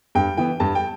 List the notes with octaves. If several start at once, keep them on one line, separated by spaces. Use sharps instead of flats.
G2 G5
E3 B3 G5
G2 A5
G5